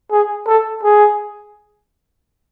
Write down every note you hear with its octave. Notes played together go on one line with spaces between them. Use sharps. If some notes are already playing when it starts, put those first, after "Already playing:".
G#4
A4
G#4